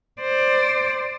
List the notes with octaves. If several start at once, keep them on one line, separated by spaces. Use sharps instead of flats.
C5 D5